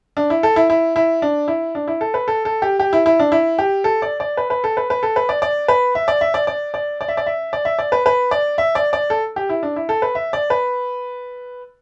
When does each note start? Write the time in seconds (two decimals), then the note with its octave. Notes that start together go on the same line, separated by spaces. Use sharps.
0.17 D4
0.30 E4
0.43 A4
0.56 E4
0.70 E4
0.96 E4
1.22 D4
1.48 E4
1.75 D4
1.88 E4
2.01 A4
2.14 B4
2.28 A4
2.45 A4
2.62 G4
2.79 G4
2.93 E4
3.06 E4
3.19 D4
3.32 E4
3.59 G4
3.84 A4
4.02 D5
4.20 D5
4.37 B4
4.50 B4
4.64 A4
4.77 B4
4.90 B4
5.03 A4
5.16 B4
5.29 D5
5.42 D5
5.68 B4
5.95 E5
6.08 D5
6.21 E5
6.34 D5
6.47 D5
6.74 D5
7.01 D5
7.08 E5
7.17 D5
7.26 E5
7.53 D5
7.65 E5
7.79 D5
7.92 B4
8.06 B4
8.31 D5
8.58 E5
8.75 D5
8.93 D5
9.10 A4
9.36 G4
9.49 E4
9.63 D4
9.76 E4
9.89 A4
10.02 B4
10.15 E5
10.33 D5
10.50 B4